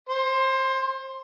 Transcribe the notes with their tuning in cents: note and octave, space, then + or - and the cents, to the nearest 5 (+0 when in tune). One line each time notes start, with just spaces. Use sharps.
C5 +30 C6 +0